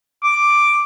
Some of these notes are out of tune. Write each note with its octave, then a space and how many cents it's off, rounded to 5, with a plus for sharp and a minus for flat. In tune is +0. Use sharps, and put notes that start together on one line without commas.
D6 +5